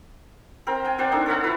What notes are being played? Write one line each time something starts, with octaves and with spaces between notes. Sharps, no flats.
C4 A#4
G5 G#5
C4 F#4 C5 D5
D4 D#4 A4
A4 C#5 E5 F#5
E4 F4 B4